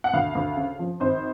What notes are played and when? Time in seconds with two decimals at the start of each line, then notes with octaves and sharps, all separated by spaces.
0.04 F#5
0.14 D2 F5
0.35 D2
0.57 C#3
0.79 F3
1.00 G#1 C5